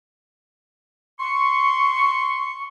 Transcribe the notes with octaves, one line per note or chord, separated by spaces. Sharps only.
C6 C#6